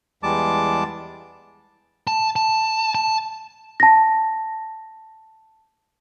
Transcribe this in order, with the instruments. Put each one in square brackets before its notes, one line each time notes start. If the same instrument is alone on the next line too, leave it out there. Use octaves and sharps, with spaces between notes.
[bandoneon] E2 G3 G#3 A5 D6
[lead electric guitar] A5
A5
A5
[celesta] A5 A#6